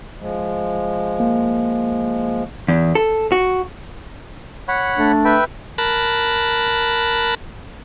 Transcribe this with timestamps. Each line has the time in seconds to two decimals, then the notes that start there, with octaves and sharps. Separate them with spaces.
0.19 F3 G#3
1.20 A#3
2.68 E2
2.95 A4
3.32 F#4
4.68 C#5 F#5 B5
4.97 A3 D4
5.25 B4 E5 G5
5.78 A#4 A5 B5 F#6